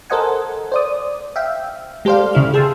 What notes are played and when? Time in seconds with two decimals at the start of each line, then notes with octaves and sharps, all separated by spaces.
0.10 A4 A#4 C5 D#5 F#5 G#5
0.72 C5 D5 D#6
1.36 E5 F5 G5
2.05 G#3 G4 A4 C5 D5 F5
2.33 C#3 E4 F6
2.54 G#4 G5 A5 C6 E6